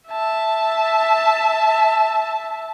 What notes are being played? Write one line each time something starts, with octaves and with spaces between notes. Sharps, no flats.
E5 A5